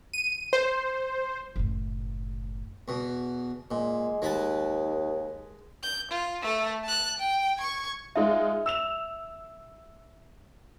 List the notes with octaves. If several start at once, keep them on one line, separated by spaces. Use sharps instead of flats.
D#7
C5
F#1 A2
E2 B2
A#2 G#3
D#2 G#3 B4 A5
G6
F4
A3 A4
A5 F#6
G5
C#6 G#6
G#3 D#4 F4 E5
E6 E7 F7